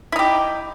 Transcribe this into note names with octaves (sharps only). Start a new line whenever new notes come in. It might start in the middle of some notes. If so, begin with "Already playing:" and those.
D#4 E4 G4